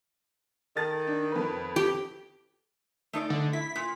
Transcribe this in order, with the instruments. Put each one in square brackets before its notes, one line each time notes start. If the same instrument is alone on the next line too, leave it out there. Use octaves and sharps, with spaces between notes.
[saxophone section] D#3 [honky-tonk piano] A4 A6
[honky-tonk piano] D4
F2 B4
[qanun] G4
[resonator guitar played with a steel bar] A3 D#4 D5
[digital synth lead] D3
[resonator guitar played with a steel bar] E4 [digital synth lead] B6
[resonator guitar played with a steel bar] A#2